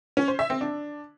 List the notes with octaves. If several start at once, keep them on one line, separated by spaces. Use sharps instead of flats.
C#4
C5
E5
C4
D4